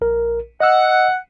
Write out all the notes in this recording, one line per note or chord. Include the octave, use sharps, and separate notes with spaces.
A#1 A#4
D#5 F#5 E6